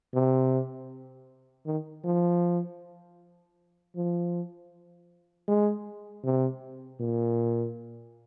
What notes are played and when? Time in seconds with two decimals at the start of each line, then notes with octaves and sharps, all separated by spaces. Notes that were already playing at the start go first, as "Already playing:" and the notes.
0.14 C3
1.66 D#3
2.04 F3
3.96 F3
5.48 G#3
6.24 C3
7.00 A#2